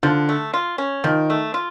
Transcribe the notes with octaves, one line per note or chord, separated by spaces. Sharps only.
D3 F3
A3
F4
C#4
D#3 F3
A3
F4